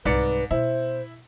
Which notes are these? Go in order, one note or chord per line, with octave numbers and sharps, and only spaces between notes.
C2 G#2 B4 D5 C#7
B2 E4 C5